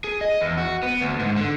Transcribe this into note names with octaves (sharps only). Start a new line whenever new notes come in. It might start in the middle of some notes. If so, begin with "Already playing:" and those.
G#4
D#5
E2
F#4
B3
D2
G#2
D3